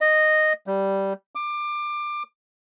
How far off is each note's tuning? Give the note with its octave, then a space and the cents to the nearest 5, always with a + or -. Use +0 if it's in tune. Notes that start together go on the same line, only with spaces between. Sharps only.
D#5 -10
G3 -5
D6 +25